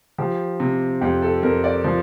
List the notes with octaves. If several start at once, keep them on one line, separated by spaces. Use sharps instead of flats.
F3 G4
C3
F2 G4
A4
F2 A#4
D5
F3